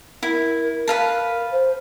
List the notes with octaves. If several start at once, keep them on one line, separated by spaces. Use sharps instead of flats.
E4 A#4
B4 F5 A5
C5